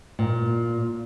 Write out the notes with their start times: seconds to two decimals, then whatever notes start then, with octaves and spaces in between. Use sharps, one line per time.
0.19 A#2